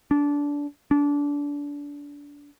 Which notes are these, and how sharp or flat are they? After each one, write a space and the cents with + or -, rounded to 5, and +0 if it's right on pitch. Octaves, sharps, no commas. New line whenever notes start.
D4 -20
D4 -25